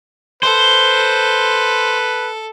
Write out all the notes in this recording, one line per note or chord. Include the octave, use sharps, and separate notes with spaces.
A4 B4 C5